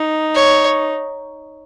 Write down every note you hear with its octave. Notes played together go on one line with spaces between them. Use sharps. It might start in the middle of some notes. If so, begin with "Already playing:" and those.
Already playing: D#4
C#5